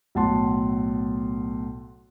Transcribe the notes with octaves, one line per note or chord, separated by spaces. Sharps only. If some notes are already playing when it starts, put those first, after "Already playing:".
B1 A2 F#5 A5 C6